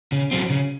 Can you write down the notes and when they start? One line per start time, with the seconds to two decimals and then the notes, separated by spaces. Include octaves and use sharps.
0.12 C#3
0.31 F#3 C4
0.50 C#3